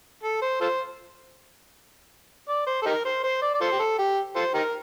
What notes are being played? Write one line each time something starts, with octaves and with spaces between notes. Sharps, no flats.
A4
C5
F4 A4 C5
D5
C5
A4
D#4 G4 A#4
C5
C5
D5
D5
F4 A4 C5
G4
A4
G4
F4 A4 C5
D#4 G4 A#4